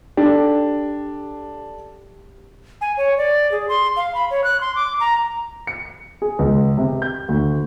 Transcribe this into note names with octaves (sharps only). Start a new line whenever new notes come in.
D4 G4 A4
G#5
C#5
D5
G#4
C6
F5
B5
C#5
F#6
C6
D6
A#5
C#7
G#4
C#2
C3
G6
D2